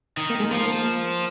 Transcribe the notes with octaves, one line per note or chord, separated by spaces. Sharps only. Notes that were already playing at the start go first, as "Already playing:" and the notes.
D#3
A#3
G#3
F3 A#3